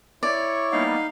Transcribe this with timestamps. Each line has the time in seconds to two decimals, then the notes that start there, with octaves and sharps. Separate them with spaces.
0.23 E4 C#5 D5 C#6
0.72 G3 A#3 B3 D#4 F5